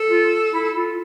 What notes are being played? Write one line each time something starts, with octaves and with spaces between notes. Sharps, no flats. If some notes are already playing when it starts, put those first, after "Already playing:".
Already playing: A4
F4
E4
F4